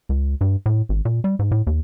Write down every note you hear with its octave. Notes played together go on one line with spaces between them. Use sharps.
C#2
G2
A2
G#1
A#2
G3
G#2
A2
D#2